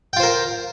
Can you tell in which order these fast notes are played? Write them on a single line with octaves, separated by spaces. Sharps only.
G5 F4 C5 A#4